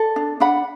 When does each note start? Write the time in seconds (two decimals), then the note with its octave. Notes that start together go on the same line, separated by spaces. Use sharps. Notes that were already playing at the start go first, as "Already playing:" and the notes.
Already playing: A4 D5
0.16 D4
0.40 D4 F#5 B5